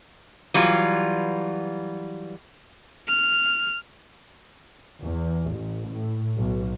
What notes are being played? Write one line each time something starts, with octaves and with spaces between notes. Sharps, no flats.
E3 F#3 G3 F4
F6
E2
A1
A2
B1